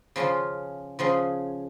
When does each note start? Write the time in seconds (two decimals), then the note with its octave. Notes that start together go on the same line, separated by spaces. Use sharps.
0.16 C#3 F3 C#4 F4
0.99 C#3 F3 C#4 G#4